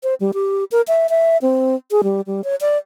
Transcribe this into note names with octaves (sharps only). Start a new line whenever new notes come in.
C5
G3
G4
A#4
E5
E5
C4
G#4
G3
G3
C#5
D5